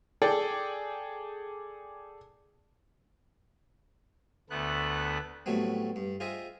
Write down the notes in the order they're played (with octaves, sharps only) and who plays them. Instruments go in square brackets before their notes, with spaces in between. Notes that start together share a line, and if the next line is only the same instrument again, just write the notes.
[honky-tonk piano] G#4 A4 D5 G5
[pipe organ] D2 A3 B3 F#6
[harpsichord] A2 F#3 G3 A3 B3 C4
G2
F4 G#4 C5 D#5 E5 G5